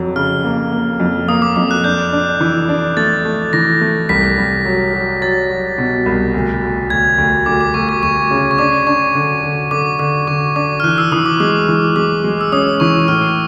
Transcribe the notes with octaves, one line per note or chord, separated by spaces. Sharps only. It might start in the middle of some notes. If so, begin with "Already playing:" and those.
Already playing: F2 F#3
C#3 F6
A#3
A#3
F2
A#3 D#6
D6
F2 D6
F#6
D4 G6
D4
E3
D4
A3 A6
A3
E3 A#6
A3
C2 B6
C2
F#3
F#3
F#3 A6
F#3
B2
C2
D2
D2
D2 G#6
D2
D2 D6
D6
D2 C#6
D6
D2 C#6
C#3
C#6
D4 D6
D4 C#6
D3
D3
D3 D6
D3 D6
D3 C#6
D4 D6
F6
E3 F#6
E6
E3 D#6
D6
G#3 D6
E3
G#3 D6
G#3
E6
C#4 D#6
E3 C#6
A2 F6